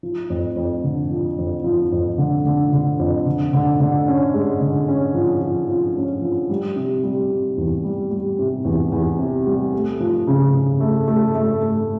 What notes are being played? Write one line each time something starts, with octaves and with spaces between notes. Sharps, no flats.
F3
F2
F2
D3
F3
F2
F3
F2
D3
D3
D3
F2
D3
D3
D3
C#4
G#3
D3
C#4
F3
F3
F3
C#4
F3
G3
C3
G3
C3
E2
G3
G3
C3
E2
E2
C3
G3
A3
F3
C#3
C#3
A3
A3
A3
A3